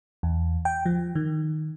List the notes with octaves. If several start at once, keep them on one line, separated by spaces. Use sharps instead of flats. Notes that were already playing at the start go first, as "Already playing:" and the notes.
E2
G5
F3
D#3